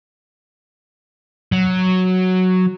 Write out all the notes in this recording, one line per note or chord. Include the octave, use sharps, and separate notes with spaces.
F#3